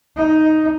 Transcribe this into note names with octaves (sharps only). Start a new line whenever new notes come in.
D#4